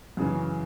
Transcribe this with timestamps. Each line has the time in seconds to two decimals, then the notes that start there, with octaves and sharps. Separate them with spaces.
0.17 F#2 C#3 E3